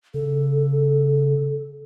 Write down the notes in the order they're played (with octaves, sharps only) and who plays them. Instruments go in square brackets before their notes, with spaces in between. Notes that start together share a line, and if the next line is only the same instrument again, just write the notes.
[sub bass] C#3 [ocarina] A4